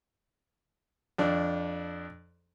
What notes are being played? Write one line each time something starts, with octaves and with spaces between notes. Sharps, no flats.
F2 D4